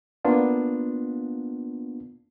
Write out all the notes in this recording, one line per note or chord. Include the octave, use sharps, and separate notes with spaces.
A#3 B3 D4 F4